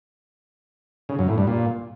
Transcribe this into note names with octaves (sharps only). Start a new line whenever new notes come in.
C#3
F#2
A2
G2
A#2